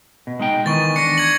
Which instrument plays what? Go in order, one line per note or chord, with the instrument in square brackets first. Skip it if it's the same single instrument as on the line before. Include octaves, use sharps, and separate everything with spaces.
[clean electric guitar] B2
G#3 D#4 G5
[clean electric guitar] D#3 E3 B3 [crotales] C#6 A6
[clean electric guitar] D4 [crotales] A#6 C#7
[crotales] G#6 C#7 F#7